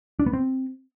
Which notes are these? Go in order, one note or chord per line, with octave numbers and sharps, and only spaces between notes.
D4
B3
C4